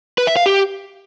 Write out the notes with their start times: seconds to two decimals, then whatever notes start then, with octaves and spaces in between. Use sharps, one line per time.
0.18 B4
0.27 E5
0.37 F5
0.46 G4